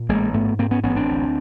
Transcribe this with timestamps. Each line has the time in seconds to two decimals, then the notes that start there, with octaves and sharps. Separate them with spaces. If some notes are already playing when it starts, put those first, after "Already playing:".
Already playing: A#2
0.09 A1 G#3 A#3
0.33 G#2 A3 B3
0.59 G#2 A#3 C4
0.71 B3 C#4
0.84 A1 B3 C#4
0.96 C4 D4
1.08 D2